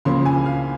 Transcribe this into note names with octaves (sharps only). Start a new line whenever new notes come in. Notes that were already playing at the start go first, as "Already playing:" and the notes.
C#2 C#3 F3 A#3 C6
G#5
F5